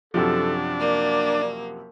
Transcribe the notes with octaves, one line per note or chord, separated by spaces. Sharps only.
F#2 C3 F3 D4 A4
A#3 D5